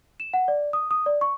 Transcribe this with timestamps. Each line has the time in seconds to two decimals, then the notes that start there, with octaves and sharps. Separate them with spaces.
0.20 E7
0.34 F#5
0.48 D5
0.73 D#6
0.91 D#6
1.06 D5
1.21 C#6